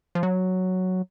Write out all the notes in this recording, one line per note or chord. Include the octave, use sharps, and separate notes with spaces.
F3
F#3